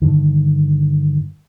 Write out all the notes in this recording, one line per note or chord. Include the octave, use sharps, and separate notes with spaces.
G2 D3 D#3